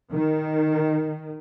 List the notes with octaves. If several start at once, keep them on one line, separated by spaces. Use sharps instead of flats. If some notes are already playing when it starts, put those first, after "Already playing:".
D#3